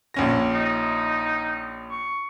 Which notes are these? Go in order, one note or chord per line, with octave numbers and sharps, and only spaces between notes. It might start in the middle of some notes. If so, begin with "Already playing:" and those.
A#1 C#4 A#6
D#4
C#6